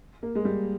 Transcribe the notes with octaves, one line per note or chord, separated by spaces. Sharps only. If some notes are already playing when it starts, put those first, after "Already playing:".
A#3
G#3
G3